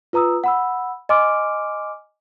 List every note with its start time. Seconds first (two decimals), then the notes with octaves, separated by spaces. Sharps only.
0.13 F4 B4 A#5 D#6 E6
0.44 F#5 B5 E6
1.09 D#5 G#5 C6 D6 F6 D7